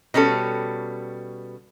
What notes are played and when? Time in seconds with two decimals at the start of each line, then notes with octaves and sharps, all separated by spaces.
0.14 B2 G3 C#4 A4